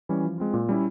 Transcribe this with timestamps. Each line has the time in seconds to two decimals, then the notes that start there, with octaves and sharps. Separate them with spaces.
0.09 E3 G3 C#4
0.24 F3
0.38 G#3 C4 F4
0.54 A#2
0.69 G3 C#4 E4